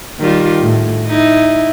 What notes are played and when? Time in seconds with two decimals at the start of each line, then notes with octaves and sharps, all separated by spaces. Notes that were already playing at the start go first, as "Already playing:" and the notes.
0.19 D#3 G3 F4
0.62 A2
1.07 D#4 E4